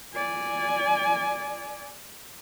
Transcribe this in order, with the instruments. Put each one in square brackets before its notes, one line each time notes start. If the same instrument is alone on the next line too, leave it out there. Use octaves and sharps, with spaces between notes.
[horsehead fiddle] D5 G#5